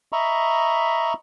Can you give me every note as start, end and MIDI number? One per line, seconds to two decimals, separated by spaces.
0.12 1.13 75
0.12 1.13 76
0.12 1.13 82
0.12 1.13 83
0.12 1.13 85